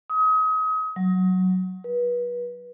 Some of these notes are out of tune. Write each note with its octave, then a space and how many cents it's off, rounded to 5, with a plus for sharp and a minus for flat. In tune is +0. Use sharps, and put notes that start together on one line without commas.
D#6 +35
F#3 +0
B4 -30